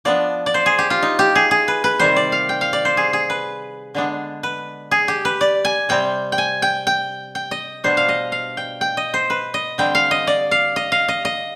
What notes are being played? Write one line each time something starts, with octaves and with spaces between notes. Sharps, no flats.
F3 B3 D4 D5
D5
C5
G#4
G4
F4
D#4
G4
G#4
G#4
B4
B4
C3 D#3 G3 C5
D5
F5
G5
F5
D5
C5
G#4
G#4
B4
D3 G#3 B3 D4
B4
G#4
G4
B4
D5
G#5
C3 G3 C4 G5
G5
G#5
G5
G5
G5
D#5
B2 G3 D4 C5
F5
D#5
F5
G5
G5
D#5
C5
B4
D#5
D3 G3 C4 G5
F5
D#5
D5
F5
D#5
F5
D#5
D#5